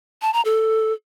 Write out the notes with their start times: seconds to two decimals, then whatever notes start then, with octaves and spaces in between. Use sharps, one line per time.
0.22 A5
0.33 A#5
0.45 A4